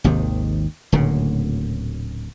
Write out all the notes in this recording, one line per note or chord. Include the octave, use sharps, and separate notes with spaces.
G#1 D#2 C3 D#3
D1 D2 A#2 C#3